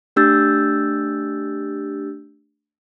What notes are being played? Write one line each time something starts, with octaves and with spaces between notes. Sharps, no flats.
A3 D4 G4 E6 G6 A6